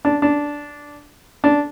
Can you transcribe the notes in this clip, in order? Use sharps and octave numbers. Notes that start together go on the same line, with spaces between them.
D4
D4
D4